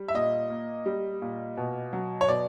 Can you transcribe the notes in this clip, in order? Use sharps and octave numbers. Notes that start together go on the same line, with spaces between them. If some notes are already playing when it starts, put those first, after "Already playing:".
Already playing: G3
E5
A#2 D#5
A#3
G3
A#2
B2
F#3
C#5
B2 D5